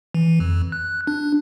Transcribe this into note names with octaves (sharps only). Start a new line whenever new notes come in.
E3
F2
F#6
D4